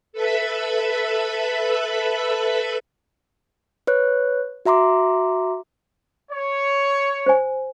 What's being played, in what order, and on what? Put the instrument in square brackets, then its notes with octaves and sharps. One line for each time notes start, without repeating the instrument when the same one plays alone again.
[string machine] A4 B4 E5 B5
[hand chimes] B4 C#5 F#6
F#4 E5 A#5 C6 D6
[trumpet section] C#5
[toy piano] C5 G#5